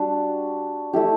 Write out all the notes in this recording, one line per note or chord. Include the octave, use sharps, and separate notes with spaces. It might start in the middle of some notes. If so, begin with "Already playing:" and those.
Already playing: G3 D4 F#4
A3 E4 G4